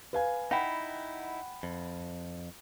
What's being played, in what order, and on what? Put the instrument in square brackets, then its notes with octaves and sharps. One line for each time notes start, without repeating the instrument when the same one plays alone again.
[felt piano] B4 F5 G#5
[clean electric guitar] D#4 E4 [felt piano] F#5 G5 B5
[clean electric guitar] F2